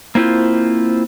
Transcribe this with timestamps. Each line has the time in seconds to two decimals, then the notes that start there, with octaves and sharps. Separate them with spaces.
0.15 A#3 C4 E4 F4 C5